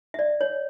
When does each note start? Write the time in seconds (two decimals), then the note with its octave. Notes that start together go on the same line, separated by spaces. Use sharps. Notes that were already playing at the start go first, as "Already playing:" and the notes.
0.14 E5
0.19 D5
0.41 C#5